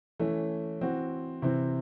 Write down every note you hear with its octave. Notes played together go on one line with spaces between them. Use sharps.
E3 A3 C#4
E3 C4 F#4
C3 E3 C4